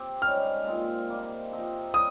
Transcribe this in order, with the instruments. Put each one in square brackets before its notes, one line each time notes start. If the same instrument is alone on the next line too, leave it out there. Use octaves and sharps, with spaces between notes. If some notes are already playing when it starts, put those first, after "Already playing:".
Already playing: [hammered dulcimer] C4 G4
[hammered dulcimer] G#2 G3 C#4 [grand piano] F6
[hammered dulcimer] A#2 G#3 C4
C3 D#3 G3 A#3
F3 C4 D#4 A#4
[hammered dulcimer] G3 C4 [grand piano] D#6